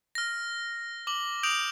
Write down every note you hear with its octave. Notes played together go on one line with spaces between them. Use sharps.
F6 A#6
D6 F#7 G7
D#6 G6 D7 F7 F#7